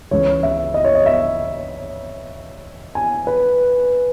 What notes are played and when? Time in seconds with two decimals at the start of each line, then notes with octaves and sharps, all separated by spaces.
0.11 C#2 C#3 E3 G#3 C#5
0.43 E5
0.74 D#5
0.85 C#5
0.95 D#5
1.06 E5
2.95 G#5
3.27 B4